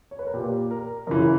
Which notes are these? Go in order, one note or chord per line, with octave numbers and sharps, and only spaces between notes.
C#5
B4
A#4
A#2 G4
A#4
F#2 C#3 E3 A#4